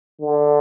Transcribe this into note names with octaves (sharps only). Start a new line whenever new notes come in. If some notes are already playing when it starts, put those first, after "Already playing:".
D3